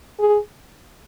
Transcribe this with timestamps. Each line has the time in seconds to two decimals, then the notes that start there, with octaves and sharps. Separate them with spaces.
0.20 G#4